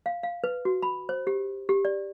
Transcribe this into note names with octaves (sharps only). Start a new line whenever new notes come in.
F5
F5
B4
F#4
B5
C5
G4
G4
D5